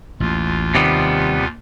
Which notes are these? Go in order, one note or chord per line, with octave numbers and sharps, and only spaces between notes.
A1 D#2 F4
C3 D#3 G3 B3